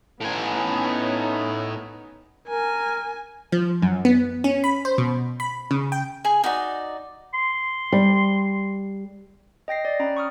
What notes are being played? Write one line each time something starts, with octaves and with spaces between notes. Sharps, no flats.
A2 B3 C#4 D#4 G#5
A#4 G#5
F3
F#2
B3
C#4
B5
C5
B2
B5
C#3
G5
G#4 G#5
D#4 F#4 D5
C6
G3
D#5 G5 A#6 C7
D5
C#4 G5 A#5 B5
C#6 D#6 F6